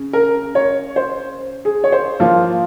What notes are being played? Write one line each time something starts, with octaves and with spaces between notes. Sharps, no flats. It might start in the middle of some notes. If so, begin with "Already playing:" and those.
Already playing: C#3
A#4
C#5
C5
G#4
C#5
C5
F3 A#3 F4